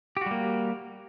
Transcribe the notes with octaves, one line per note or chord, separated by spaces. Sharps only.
G3 A#3 F#4 G4